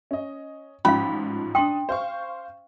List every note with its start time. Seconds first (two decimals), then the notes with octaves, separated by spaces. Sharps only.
0.11 C#4 D#5
0.85 A1 G#2 F3 C#4 F5 B5
1.55 D4 G5 C6 D#6
1.89 C5 F5 C#6